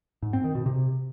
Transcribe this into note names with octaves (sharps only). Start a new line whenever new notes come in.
G#2
C4
D#3
B2
C3